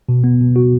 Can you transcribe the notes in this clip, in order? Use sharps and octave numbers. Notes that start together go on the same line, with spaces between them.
B2
B3
B2
F#4